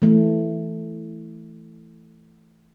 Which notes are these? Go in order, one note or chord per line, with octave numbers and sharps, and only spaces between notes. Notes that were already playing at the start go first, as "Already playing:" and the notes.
E3 A3